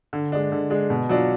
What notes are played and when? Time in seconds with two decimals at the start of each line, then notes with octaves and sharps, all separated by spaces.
0.13 D3
0.32 G#3 D4
0.52 D3
0.70 G#3 D4
0.90 B2
1.09 F#3 D4 F4